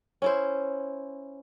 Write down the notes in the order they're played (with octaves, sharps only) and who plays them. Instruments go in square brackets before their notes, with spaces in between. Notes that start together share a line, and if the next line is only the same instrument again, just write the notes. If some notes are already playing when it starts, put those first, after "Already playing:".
[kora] C#4 E4 C5